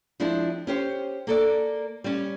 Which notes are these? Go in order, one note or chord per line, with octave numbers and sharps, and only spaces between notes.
F3 G#3 C4 D4 E4
C#4 G4 C5
A#3 A4 D5
G3 C#4